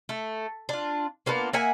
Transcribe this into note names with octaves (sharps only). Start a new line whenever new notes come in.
A3
D4 F4
A#3 B3 D4 F4
A#3 E5 F#5 G#5